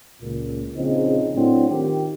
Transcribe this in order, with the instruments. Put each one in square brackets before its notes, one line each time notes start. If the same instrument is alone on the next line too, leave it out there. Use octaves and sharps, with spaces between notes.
[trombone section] C#2 A#2
A#1 C#3 F3 C4 D#4
A2 F#3 C4 D4
D#3 F4 G4